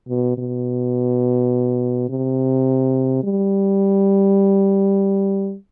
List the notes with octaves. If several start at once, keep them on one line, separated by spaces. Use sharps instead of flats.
B2
B2
C3
G3